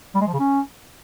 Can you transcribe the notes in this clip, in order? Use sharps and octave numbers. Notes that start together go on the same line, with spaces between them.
G3
G#3
F3
C#3
C#4